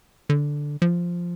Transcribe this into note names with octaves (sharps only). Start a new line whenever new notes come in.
D3
F3